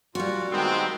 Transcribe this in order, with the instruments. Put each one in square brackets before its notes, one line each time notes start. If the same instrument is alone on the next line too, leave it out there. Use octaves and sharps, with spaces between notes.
[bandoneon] A#2 F4 [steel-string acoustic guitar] G3 F#4
[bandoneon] D#3 G#3 [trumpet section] B3 C4